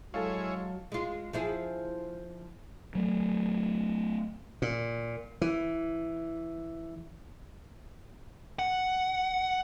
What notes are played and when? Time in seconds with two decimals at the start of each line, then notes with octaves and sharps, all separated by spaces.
0.14 F#3 G#3 E4 G#4 A4 C#5 F5
0.92 G#3 F4
1.33 F3 E4 G#4
2.95 F#3 A3
4.62 A#2
5.41 E3
8.59 F#5